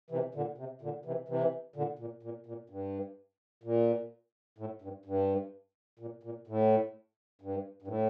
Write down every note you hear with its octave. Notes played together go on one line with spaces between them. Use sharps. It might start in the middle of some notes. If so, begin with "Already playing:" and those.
C3 E3
A#2 D3
C3
A#2 D3
C3 E3
C3 E3
A#2 D3
A#2
A#2
A#2
G2
A#2
A2
G2
G2
A#2
A#2
A2
G2
G2
A2